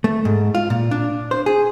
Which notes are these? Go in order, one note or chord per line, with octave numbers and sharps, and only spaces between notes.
A3
G#2
F4
A#2
D4
C5
G#4